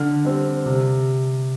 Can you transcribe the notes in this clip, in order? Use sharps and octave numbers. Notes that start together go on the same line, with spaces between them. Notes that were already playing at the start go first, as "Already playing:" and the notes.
Already playing: D3 F6
G3 C4
C3